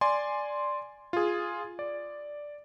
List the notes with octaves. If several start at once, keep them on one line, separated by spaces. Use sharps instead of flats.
D5 G#5 C6
F4 G#4
D5